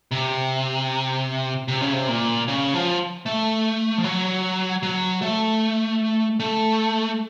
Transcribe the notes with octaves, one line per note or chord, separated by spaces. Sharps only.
C3
C3
C#3
C3
A#2
C#3
F3
A3
F3
F#3
F#3
A3
A3